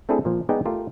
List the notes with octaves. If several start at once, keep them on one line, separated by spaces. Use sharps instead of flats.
A3 C4 D4 E4 G#4 A4
A#2 F3
G#3 B3 D#4 G#4 D5 G5
A3 F4 G4 A#4